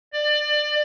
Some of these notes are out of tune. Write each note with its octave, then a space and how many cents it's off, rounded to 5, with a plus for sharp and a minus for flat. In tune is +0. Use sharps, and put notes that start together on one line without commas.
D5 +25